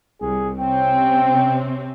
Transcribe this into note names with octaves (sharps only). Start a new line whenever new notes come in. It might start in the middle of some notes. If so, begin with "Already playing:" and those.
C2 G#4
C3 C4 C#4 G5